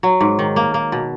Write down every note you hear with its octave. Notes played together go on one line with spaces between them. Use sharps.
F#3
G#2
D#3
A#3
A#3
B2